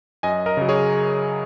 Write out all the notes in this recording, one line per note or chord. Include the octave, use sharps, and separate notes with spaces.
F#2 D#5 G#5
A#4 D#5
C#3 F#3
G#4 C#5